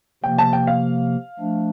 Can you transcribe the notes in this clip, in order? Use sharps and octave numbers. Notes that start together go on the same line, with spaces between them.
C3 F3 A#3 G5
A5
G5
F5
F3 A3 D4